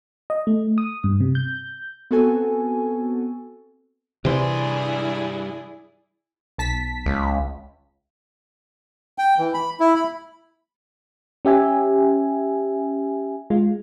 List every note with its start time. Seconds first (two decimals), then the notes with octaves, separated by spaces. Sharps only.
0.30 D#5
0.47 A3
0.78 D#6
1.04 G2
1.20 C3
1.35 G6
2.11 B3 C4 F#4 A4 G#5
4.25 G2 C3 E3 E4 G#4 D5 C6
6.58 B1 A5 B6
7.06 C#2
9.18 G5
9.38 E3
9.54 B5
9.80 E4
9.96 B5
11.45 C#4 G4 E5 G#5
13.50 G#3 F4